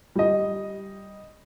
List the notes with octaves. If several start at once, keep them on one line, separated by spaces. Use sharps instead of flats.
G3 D#5